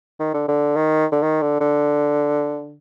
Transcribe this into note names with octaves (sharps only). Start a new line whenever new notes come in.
D#3
D3
D3
D#3
D3
D#3
D3
D3